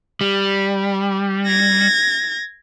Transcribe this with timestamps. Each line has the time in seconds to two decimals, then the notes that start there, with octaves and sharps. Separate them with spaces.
0.21 G3
1.46 G#6 A#6